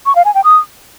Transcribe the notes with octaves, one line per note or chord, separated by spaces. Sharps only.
C#6
F5
G#5
G5
D#6